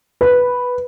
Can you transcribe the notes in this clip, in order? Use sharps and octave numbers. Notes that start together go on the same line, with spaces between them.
B4